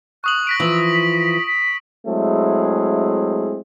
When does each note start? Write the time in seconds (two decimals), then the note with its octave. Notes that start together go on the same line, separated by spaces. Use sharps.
0.24 C#6 D#6 F#6 F#7
0.47 A#6 B6 D7
0.60 E3 F3 C#6 E6 F#7
0.90 B6
1.47 B6
2.07 F#3 G#3 A3 C4 E4 G#4